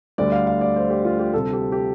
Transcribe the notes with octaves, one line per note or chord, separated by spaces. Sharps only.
D2 D3 G3 D5
F5
F5
D5
C5
G4
F4
G4
D2 C3 G3 A4
G4
G4